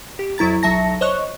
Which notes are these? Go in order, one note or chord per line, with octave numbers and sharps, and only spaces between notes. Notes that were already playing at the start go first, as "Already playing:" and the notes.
G4
F2 F#3 E4 A#5 A6
B1 F#3 E5 A5 A#6 C#7
C5 C#5 D#5 C#6 F#6